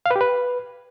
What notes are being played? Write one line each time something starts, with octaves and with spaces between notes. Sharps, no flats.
F5
B4
G4
B4